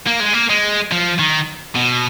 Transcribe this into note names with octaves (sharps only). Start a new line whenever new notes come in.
A#3
G#3
A#3
G#3
F3
D#3
B2